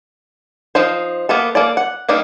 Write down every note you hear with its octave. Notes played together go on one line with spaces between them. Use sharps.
F3 D#4 C5
A#3 B3 A4
A#3 A4 D5
F#5
G3 A#3 D4 D#4